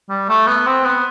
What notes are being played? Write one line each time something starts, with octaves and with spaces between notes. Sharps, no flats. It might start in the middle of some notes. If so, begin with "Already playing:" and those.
G3
A3
B3
C4
B3